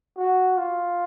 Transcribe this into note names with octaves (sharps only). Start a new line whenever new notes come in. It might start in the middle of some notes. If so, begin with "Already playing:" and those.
F#4
F4